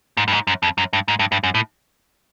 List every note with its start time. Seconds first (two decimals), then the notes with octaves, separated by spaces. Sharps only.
0.17 G#2
0.28 G2
0.32 G#2
0.47 F#2
0.63 F2
0.78 F#2
0.93 G2
1.08 G#2
1.19 G2
1.32 G2
1.43 F#2
1.55 A2